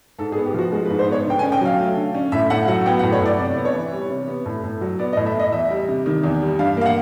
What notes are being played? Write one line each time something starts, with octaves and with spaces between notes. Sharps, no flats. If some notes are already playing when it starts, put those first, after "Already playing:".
G#2 A4
G#4
B3
G4
F3 F#4
G#3 F#4
B4
G#2
C5
B3 C#5
D3 G5
G#5
C#4
G5
F#3 F5
A3
D3
C#4
A2 E5
A2 F#5
F#3 F#5
B3 G5
F#5
A2
C#5
A2 D5
C3 D5
B3
C#5
E3
G3
C3
B3
A2
A2
F#3
B3 D5
D#5
A2
E5
A2
D#5
E2 E5
G3
C3
D#3
E2
G3
G2 F5
A#3 F5
F#5